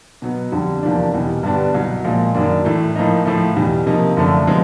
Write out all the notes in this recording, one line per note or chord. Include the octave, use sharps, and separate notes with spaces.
B2 F#3 B3
F2 D3 G3
E2 C3 F3 A#3 D4
E2 B2 G3
G2 D3 G3 B3 D4
C2 B2 F#3
A#2 F3 G#3
F#2 D#3 F#3 A#3 D4
A2 E3 A3
A2 F3 A#3 D#4
A2 F3 A3
E2 B2 G3
C3 F3 A#3 D#4
F#2 D3 F3 A3 D4
C3 F3 G#3 B3